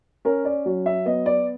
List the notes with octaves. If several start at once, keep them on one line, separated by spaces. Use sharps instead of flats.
C#4 A#4
D5
F#3
E5
B3 D#5
D5